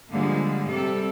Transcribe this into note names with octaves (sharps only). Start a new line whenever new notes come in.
D3 F3 G3 G#3 A#3
C3 G3 A4